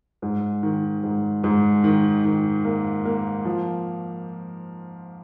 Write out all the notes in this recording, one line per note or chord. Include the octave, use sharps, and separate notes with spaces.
G#2
D#3
G#2
G#2
D#3
D#3
A#3
A#3
F3